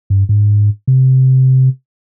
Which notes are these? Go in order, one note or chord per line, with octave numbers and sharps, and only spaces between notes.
G2
G#2
C3